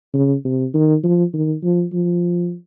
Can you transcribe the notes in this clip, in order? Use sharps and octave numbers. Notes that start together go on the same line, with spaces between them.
C#3
C3
D#3
F3
D#3
F3
F3